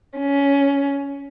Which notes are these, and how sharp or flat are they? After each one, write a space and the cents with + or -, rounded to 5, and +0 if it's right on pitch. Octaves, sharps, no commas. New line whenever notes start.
C#4 +15